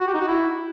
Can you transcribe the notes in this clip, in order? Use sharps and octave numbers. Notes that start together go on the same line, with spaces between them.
F#4
G4
D#4
F#4
E4